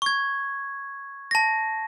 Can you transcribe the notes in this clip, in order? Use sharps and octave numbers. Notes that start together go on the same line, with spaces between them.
C#6 G#6
A5 A#6